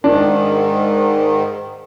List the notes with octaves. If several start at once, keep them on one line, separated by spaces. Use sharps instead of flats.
G#2 D#3 D4